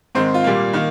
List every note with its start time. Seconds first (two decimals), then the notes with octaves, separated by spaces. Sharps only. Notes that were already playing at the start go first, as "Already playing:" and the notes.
0.15 G#2 D#3 G#3 C4 C5
0.34 F4
0.44 A#2 G3 A#3
0.73 D#3 A#3